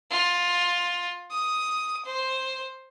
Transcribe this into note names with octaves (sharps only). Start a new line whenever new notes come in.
F4
D#6
C5